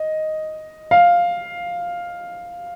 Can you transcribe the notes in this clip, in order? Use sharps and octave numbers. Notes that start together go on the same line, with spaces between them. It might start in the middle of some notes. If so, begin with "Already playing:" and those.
Already playing: D#5
F5